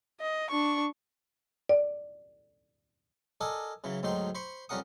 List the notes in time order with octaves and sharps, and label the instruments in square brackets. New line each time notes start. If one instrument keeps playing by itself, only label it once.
[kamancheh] D#5
D4 C#6
[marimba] D5
[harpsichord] A4 A#4 D5 D#5 G#5
C#3 E3 F#3
D2 G#2 F#3 D#4 C5 G5
C5 B5 C#6
F2 G3 C#4 A#4 F#5 D#6